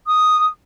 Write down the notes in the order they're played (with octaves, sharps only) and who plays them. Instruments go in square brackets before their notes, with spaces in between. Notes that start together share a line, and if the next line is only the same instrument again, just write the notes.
[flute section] D#6